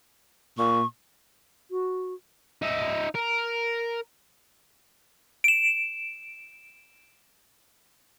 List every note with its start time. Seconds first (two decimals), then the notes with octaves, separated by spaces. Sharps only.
0.58 A#2 C#6
1.70 F#4
2.62 D#4 E5
3.15 A#4
5.44 D7 E7